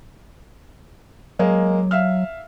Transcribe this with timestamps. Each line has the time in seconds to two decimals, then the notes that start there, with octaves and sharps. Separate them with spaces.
1.39 F#3 G#3 A#3
1.91 E5 F5 F6